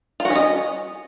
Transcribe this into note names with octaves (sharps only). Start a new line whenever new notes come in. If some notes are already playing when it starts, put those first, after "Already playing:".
F4
F#4
C#4
D#5